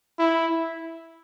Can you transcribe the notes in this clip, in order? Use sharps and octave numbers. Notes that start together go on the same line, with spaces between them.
E4